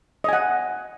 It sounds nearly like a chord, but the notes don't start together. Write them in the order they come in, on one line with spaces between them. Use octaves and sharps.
D#5 G#5 F#5